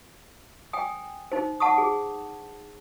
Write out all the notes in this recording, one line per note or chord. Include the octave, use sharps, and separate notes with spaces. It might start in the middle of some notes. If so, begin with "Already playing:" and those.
G5 G#5 D#6
D#4 C5
F#5 A5 C#6 D#6
G#4